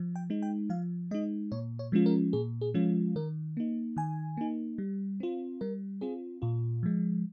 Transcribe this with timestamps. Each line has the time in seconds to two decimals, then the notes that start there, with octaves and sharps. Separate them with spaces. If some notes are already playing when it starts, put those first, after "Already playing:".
Already playing: F3
0.16 G5
0.30 G#3 D#4
0.42 G5
0.69 F3 F5
1.11 G#3 D#4 D#5
1.52 A#2 C#5
1.79 C#5
1.92 F3 G#3 C#4 F4
2.06 A#4
2.33 A#2 G#4
2.61 G#4
2.74 F3 G#3 C#4 F4
3.16 D#3 A#4
3.57 A#3 D#4
3.96 D#3 G#5
4.37 A#3 D#4
4.78 G3
5.20 C4 F4
5.61 G3 A#4
6.01 C4 F4 G#4
6.42 A#2 F4
6.83 F3 G#3